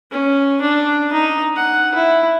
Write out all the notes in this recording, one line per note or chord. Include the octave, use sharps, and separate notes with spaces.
C#4
D4
D#4
F#5
E4